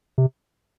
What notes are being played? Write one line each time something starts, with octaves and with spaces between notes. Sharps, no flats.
C3